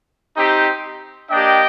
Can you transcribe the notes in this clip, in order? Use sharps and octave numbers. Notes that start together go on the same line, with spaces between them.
C4 D#4 G4
A#3 D4 G4 D#5 G5